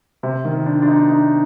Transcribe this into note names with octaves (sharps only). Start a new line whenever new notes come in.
C3
D#3
D4
D4
D#4
D#4